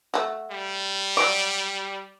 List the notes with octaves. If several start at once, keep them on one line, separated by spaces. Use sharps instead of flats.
A3 F#4
G3
F#3 D5 D6